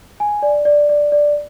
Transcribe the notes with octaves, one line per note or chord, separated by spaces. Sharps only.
G#5
D5
D5
D5
D5